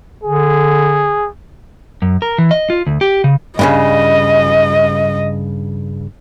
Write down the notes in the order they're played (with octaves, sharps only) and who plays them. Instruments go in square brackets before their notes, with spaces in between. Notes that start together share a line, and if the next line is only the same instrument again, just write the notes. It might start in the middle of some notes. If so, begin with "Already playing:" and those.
[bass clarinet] D3 [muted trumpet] G#4
[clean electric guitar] F#2
A#4
E3
D#5
F4
D2
G4
C#3
[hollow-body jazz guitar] G2 A#2 C#3 [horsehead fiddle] D#5